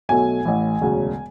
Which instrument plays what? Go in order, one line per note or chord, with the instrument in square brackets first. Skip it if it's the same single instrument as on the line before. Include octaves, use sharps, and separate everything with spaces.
[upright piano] B1 B2 F#3 A3 G#5
A1 A2 E3
E1 D2 C#3 F#3